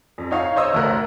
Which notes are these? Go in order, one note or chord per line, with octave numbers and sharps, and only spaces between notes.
F2
D#4 C#5 F5 C#6
C5 C#5 D#5 E6
F1 D2 A3 A#4 F#6